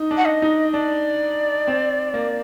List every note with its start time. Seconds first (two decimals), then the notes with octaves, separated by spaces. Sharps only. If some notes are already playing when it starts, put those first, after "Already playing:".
Already playing: D#4
0.11 D4
0.17 F#5
0.26 D#5
0.42 D#4
0.73 D4 D5
1.67 C4
2.14 A#3